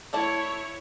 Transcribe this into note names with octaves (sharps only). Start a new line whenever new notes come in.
A3 E4 C#5 D5 A5